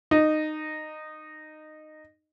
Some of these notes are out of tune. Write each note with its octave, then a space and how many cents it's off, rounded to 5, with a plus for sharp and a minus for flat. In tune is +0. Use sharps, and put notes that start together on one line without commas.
D#4 -15